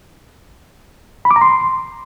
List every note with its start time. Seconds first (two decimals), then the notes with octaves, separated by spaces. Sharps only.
1.25 B5
1.31 D6
1.36 A#5
1.41 C6